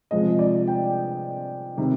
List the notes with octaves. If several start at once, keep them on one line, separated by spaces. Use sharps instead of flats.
C3 F3 G#3 D#5
D5
G5
C3 D#3 G3